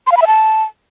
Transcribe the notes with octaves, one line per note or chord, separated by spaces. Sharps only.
C6
F5
B5
E5
A5